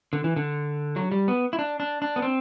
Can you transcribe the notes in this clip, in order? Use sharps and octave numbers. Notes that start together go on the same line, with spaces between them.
D3
E3
D3
F#3
G3
B3
E4
D4
D4
D4
B3
C4